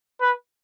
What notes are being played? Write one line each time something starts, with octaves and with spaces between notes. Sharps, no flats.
B4